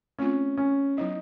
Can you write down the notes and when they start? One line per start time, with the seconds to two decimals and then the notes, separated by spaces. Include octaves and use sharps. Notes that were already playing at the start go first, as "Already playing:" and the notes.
0.19 A3 C4 C#4 F4
0.57 C#4
0.97 F#3 B3 D#4 E4